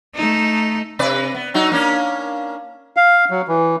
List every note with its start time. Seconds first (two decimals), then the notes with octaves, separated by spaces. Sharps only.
0.15 A3 D#4
0.99 C3 B4 D5
1.35 B3
1.54 F#3 D#4 F#4
1.72 A#3 C#4 D4
2.97 F5
3.31 F#3
3.48 E3